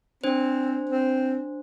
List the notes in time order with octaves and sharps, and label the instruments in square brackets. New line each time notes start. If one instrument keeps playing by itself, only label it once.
[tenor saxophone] C4 [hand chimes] D4 C5
[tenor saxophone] C4